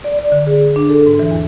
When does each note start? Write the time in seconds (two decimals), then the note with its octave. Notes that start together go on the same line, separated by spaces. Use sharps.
0.04 D5
0.19 D5
0.32 D3
0.47 G#4
0.76 D4
0.89 A4
1.07 G#2
1.19 E3
1.31 E2